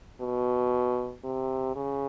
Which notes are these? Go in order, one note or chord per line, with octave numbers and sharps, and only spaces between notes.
B2
C3
C#3